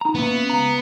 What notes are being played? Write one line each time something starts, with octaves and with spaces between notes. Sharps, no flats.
D#4 A#5
A#3 B3 C#4 E4
C#2 F5 A#5